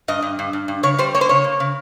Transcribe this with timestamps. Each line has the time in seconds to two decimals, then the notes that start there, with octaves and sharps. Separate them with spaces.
0.08 G2 D#5
0.22 G2
0.39 G2
0.53 G2
0.68 G2
0.83 C#3 C#5
0.98 G3 C5
1.15 A#3 C#5
1.21 C5
1.29 C#3 C#5
1.44 A#3
1.60 C#3